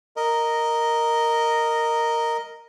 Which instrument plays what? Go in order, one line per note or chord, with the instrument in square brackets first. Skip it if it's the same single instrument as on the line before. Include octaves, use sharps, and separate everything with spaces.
[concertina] A#4 D#5